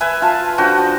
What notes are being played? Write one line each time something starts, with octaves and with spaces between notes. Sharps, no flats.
B4 E5 G#5
F4 A5
D3 F3 F#4 G5